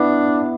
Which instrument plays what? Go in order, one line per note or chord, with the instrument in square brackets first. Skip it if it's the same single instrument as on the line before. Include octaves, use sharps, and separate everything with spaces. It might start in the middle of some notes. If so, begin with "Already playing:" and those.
Already playing: [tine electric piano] B3 E4 [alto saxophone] D4